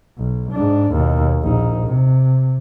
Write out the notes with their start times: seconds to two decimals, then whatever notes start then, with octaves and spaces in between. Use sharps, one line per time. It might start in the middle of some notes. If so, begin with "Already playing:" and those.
0.18 B1
0.52 G#2 D4
0.92 D#2 B2
1.42 A#1 D#4
1.86 C3